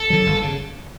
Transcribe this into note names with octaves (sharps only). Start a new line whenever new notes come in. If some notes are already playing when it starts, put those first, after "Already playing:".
Already playing: A4
D3 F#3
G1
C#3